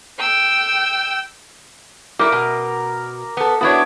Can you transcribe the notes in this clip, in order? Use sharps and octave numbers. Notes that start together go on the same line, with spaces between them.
G5 E6
G3 E4 A#4 D6
B2
B3 A4
B3 D4 E4 F#4 C#5